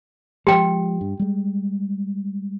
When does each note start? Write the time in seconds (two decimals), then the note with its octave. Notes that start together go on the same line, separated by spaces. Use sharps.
0.47 F3 G3 G#3 G4 G5
1.01 G2
1.19 G3 G#3